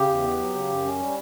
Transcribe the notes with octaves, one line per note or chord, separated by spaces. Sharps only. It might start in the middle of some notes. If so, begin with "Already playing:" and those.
Already playing: C#3 G4
E2
B3
F#3
C#3
F#2
C#4
G3